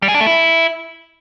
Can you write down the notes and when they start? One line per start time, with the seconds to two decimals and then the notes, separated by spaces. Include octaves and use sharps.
0.02 G3
0.08 G#4
0.14 D4
0.21 A3
0.27 E4